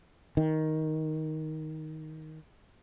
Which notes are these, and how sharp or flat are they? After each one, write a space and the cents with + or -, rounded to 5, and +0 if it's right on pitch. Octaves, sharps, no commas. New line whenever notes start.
D#3 +10